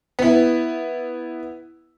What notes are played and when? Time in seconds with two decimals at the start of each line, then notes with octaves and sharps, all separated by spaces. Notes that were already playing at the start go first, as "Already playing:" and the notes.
0.19 B3 E4